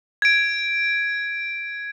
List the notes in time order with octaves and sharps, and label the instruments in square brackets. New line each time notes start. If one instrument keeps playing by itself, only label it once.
[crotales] G#6 D7